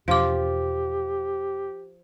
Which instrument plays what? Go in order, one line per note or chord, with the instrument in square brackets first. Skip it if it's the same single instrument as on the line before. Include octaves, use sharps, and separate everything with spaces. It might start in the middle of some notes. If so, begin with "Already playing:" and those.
[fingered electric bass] E2 B2 D4 [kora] F3 F4 [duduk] G4 [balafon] F5 D6